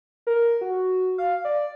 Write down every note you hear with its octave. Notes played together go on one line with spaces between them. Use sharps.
A#4
F#4
F5
D5